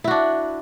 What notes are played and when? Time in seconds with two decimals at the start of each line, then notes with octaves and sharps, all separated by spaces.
0.04 E4
0.08 F#4
0.11 D4